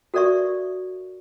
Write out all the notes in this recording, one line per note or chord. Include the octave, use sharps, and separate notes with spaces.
F#4 A4 A#4 D5 E5 C#6